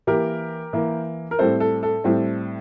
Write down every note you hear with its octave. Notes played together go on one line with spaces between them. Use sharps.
E3 A#3 G4 A#4
E3 A#3
A#4
A2 G3 C4 A4 C5
A4
A4
A2 G3 C4